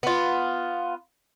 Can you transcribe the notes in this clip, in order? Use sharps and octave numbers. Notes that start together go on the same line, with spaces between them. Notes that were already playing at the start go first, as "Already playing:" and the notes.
B3 F4